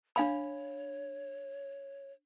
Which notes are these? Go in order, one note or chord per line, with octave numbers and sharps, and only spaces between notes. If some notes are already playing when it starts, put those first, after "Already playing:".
D4 C#5 F5 B5